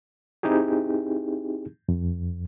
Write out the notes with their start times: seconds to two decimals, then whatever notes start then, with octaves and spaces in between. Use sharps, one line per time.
0.43 C4 D#4 E4 G4 G#4
1.89 F2